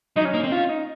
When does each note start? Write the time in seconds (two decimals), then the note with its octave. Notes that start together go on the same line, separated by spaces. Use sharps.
0.17 F#3 D#4
0.25 C#4
0.34 A#3 D#4
0.44 C4
0.52 C#4 F4
0.69 D#4